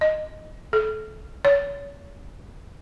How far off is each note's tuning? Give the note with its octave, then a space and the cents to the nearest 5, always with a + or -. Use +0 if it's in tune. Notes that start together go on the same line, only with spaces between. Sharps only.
D#5 -10
A4 -25
C#5 +35